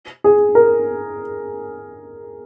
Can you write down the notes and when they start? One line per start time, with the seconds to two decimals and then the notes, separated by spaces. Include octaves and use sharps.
0.24 G#4
0.55 A#4